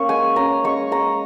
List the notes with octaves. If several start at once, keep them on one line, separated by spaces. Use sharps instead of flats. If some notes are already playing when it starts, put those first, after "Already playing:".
Already playing: A#3 C#4 C#6
G#3 G#5
C#4 A#5
G#3 C#6
G#3 A#5